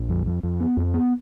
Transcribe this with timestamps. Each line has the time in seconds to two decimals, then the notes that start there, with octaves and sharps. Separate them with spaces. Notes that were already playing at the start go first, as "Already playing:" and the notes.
Already playing: A#1
0.09 F2
0.26 F2
0.43 F2
0.60 B3
0.77 F2
0.94 B3